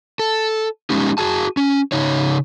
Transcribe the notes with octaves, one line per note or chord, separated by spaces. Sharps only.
A4
G#3 C#4 D#4 G4
F#4 G#4 A5
C#4
C#3 D#4 C#5